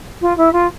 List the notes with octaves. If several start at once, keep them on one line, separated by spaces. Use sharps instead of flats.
F4
E4
F4